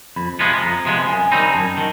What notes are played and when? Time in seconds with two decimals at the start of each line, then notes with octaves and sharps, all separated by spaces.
0.16 F2 B5
0.39 C3 F3 G#3 B3
0.62 F2 A#5
0.85 C3 F3 G#3 B3
1.08 F#2 G#5
1.32 D#3 G3 C4 D#4 B5
1.44 A#5
1.54 F#2 A5
1.77 D#3